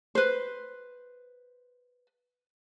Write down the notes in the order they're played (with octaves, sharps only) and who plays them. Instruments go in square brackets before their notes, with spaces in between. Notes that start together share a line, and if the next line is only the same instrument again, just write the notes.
[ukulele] B4 C5